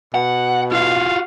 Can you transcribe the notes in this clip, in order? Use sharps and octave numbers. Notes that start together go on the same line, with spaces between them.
B2 F#5
F4 F#4 F5